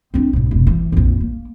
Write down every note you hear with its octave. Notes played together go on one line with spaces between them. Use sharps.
C4 D4
B1 G#2
F1 B2
E3
A#1 F2
A#3